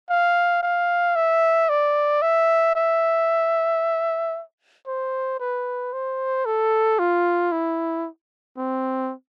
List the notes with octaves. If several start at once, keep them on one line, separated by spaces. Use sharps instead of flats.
F5
F5
E5
D5
E5
E5
C5
B4
C5
A4
F4
E4
C4